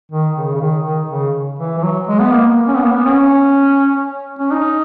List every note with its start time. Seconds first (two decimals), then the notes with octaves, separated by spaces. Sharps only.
0.11 D#3
0.36 C#3
0.55 C#3
0.61 D#3
0.85 D#3
1.10 C#3
1.59 E3
1.78 E3
1.82 F#3
2.07 G#3
2.20 B3
2.31 A#3
2.68 C#4
2.75 B3
2.83 A#3
2.90 B3
3.05 C#4
4.39 C#4
4.51 D#4